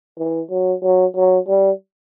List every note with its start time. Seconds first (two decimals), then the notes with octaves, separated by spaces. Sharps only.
0.18 E3
0.51 F#3
0.83 F#3
1.16 F#3
1.48 G3